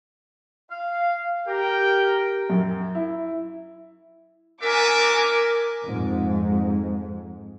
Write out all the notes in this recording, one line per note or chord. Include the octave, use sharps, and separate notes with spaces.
F5
G4 A#4 G5
F#2
E4
D4 F#4 A#4 E5 G#5 D6
F2 G#2